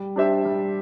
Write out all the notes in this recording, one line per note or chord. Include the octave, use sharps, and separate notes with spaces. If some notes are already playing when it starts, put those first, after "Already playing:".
Already playing: G3
D4 G4 C5 E5
G3